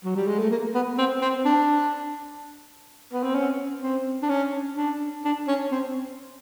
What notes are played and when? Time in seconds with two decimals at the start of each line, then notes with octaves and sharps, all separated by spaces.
0.05 F#3
0.15 G3
0.27 G#3
0.39 A3
0.50 A#3
0.74 B3
0.98 C4
1.21 C4
1.45 D4
3.12 B3
3.23 C4
3.35 C#4
3.82 C4
4.22 D4
4.29 C#4
4.76 D4
5.24 D4
5.48 C#4
5.71 C4